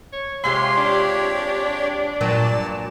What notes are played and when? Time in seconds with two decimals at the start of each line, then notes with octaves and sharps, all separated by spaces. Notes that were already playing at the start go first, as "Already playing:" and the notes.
0.12 C#5
0.44 C3 G#3 F4 G4 C#5 C6
0.77 D4
2.21 G2 A#2 F#3 D5 A5